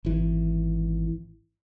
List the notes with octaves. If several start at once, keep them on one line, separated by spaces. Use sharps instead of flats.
G#1 E3